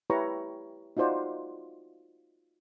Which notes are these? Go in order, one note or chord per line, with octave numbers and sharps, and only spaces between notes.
E4 G4 B4 C#5 A#5 C#6
D#4 F4 F#4 C5 D5 F#5